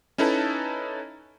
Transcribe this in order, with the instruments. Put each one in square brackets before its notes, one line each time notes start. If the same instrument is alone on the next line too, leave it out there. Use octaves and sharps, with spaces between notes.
[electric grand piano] C#4 D#4 E4 A4 B4 A5